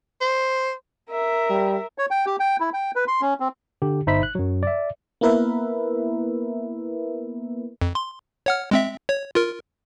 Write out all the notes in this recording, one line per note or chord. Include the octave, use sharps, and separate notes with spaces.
C5
A#4 E5
G3
C#5
G5
G4
G5
E4
G5
B4
C6
C#4
C4
D3 G4
G1 D#4 C5 E5 B5 B6
F#6
F#2 F#3
D5 E5
A#3 B3 E4 A#4 B4 E5
F2
C6
C#5 F#5 F6
G#3 C4 E5
C#5
F4 A#4